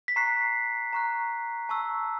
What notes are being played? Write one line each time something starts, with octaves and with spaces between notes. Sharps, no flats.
B6
A#5 C#6 F#6 C7
A#5 C#6 F#6
A5 C#6 E6